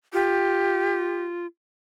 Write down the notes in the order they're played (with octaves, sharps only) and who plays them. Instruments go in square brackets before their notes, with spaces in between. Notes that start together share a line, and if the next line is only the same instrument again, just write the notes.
[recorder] F4 [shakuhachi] G4